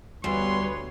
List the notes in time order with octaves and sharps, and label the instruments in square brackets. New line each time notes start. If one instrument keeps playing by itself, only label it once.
[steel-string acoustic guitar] D2 [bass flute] G3 [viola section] B3 B4 C#5 [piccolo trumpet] C6